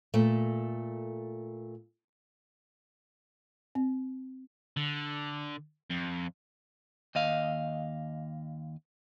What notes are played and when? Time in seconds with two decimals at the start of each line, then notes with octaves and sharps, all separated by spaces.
0.14 A#2 A3
3.75 C4
4.77 D3
5.90 F2
7.15 D#2 D#5 F5